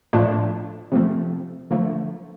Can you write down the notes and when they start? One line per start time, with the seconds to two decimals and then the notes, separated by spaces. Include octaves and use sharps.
0.13 A2 F3 A3 D4
0.92 C3 F3 A3
1.71 D3 F3 A3